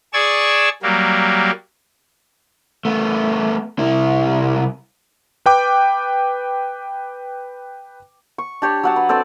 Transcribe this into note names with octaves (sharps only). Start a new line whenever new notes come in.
G#4 D5 C#6 E6 G#6
F#3 G3 A#3
A3 B3
C2 E4
B4 G5 D6
C#6
D4 G4 C#5
F#3 F#5 A5
B4
C4 A4 B4 D5